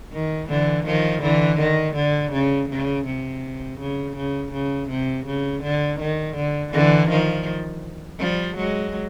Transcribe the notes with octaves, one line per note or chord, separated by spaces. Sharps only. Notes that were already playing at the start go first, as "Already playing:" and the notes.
D#3
D3 E3
D#3 F3
D3 E3
D#3
D3
C#3
C#3
C3
C#3
C#3
C#3
C3
C#3
D3
D#3
D3
D3 E3
D#3 F3
F3 G3
F#3 G#3